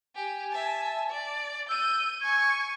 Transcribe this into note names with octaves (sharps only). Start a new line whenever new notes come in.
G4 G#5
E5 A5
D5
E6 G6 D#7
G#5 C#6 G#6